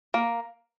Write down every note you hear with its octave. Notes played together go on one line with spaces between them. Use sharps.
A#3